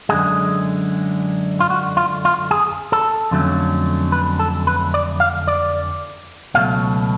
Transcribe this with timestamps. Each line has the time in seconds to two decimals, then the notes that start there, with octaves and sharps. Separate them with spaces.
0.09 F#2 D3 G#3 G#4
1.60 F4
1.70 F#4
1.97 F4
2.25 F4
2.51 G#4
2.92 A4
3.31 F2 D3 F#3 A3 C#4
4.12 B4
4.39 A4
4.67 B4
4.94 D5
5.20 F5
5.48 D5
6.54 C#2 B2 F#3 A3 F5